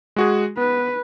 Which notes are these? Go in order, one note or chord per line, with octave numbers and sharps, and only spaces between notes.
G#3 F#4 G#4
B3 B4